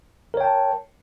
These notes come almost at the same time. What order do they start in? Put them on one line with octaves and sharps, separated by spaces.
A#4 C#5 G5 A5